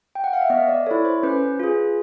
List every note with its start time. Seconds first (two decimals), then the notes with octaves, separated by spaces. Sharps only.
0.15 G5
0.24 F#5
0.33 F5
0.41 E5
0.50 B3 D#5
0.68 D5
0.86 E4 A4 C#5
1.05 C5
1.23 C#4 B4
1.59 F4 G#4